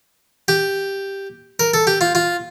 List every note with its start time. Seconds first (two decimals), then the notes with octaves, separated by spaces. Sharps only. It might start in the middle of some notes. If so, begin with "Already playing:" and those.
0.48 G4
1.60 A#4
1.74 A4
1.87 G4
2.01 F4
2.15 F4